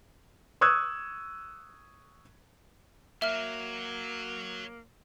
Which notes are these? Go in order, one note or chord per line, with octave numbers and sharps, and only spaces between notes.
C#6 D#6 E6 F#6 G#6
F#3 A#3 E5 F6